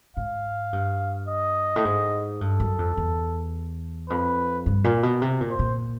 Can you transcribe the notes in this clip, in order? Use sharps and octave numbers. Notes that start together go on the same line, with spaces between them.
G#2 F5
G2
D#5
A2
G#2
G2 A4
F#2
F2
E2
F2 B4
G2
A#2
B2
C3
A#2
C5
A#2